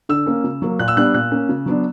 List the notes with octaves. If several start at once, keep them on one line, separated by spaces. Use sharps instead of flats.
D3 E6
A#3 C#4
C#3
F#3 A#3
A#2 F#6
E6
G3 B3 D4 F#6
A#2 F#6
A#3 C#4
C#3
F#3 B3 D4